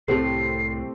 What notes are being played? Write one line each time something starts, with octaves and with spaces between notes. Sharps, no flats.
C2 A2 A3 C4 G4 C7